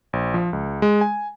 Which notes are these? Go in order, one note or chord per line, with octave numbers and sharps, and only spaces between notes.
A#1
F3
C#2
G#3
G#5